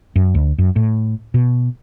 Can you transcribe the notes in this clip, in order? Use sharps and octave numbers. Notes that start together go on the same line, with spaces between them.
F#2
D2
F#2
A2
B2